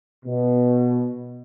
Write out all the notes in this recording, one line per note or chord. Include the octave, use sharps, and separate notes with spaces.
B2